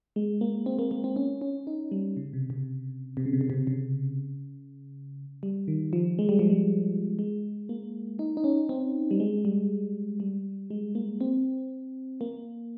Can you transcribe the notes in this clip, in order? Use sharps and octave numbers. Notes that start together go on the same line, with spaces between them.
G#3
A#3
C4
A#3
A#3
C4
C#4
C#4
D#4
G3
C#3
C3
C3
C3
C#3
C3
C#3
C3
C#3
G3
D#3
F3
G#3
G3
F3
G3
G#3
A#3
D#4
D#4
C#4
C4
G3
G#3
G3
G3
G#3
A#3
C4
A#3